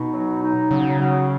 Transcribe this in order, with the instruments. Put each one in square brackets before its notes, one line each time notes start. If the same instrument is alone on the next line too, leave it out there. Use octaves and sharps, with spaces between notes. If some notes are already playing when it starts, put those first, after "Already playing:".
Already playing: [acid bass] B2 [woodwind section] D#4
[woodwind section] F#3
D#4
[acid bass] C#3 [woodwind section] F#3
[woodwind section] F#3